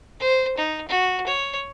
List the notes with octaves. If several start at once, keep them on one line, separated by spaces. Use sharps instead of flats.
C5
D#4
F#4
C#5